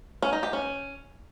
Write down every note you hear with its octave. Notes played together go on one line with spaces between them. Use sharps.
C#4
D#4
G4
C#4